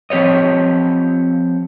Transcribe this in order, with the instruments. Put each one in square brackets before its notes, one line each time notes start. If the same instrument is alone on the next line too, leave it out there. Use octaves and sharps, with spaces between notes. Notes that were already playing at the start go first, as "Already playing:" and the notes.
[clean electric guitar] F3 C4 G4 C#5 D#5